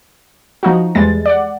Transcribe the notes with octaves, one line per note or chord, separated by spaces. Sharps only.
F3 D#4 F#4
E2 G3 G#3 A6
D5 F#5